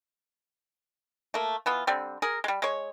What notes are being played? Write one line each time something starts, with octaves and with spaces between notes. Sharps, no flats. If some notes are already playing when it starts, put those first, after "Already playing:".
A3 A#3
E3 B3 F4
D3 G3 C4
G#4 A#4
G3 G#3
G#3 C#5